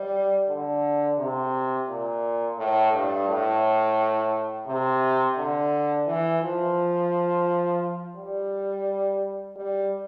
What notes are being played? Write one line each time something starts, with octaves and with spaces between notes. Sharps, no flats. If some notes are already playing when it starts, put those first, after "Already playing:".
Already playing: G3
D3
C3
A#2
A2
G2
A2
C3
D3
E3
F3
G3
G3